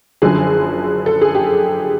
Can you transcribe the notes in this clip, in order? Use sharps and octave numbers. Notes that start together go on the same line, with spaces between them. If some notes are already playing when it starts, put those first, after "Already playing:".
F#1 F#2 D3 F3 G#4
A4
G#4
G4